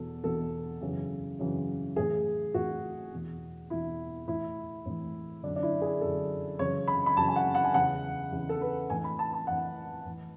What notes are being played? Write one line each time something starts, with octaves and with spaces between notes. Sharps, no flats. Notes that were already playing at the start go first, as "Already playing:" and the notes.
Already playing: E2 B2 A4
E2 B2 A4
F#2 C#3 E3
F#2 C#3 E3
A2 E3 G#4
A2 E3 F#4
E2 B2
E2 B2 E4
A2 E3 E4
A2 E3
F#2 D3 D4
D4
E4
G#4
F#2 D3 A4
F#2 C#3 E3 C#5
B5
B5
F#2 C#3 E3 A5
G#5
F#5
F#5
G#5
E2 C#3 E3 F#5
E2 C#3 E3
A4
B4
A2 E3 G#5
B5
A5
A5
A2 E3 F#5
A2 E3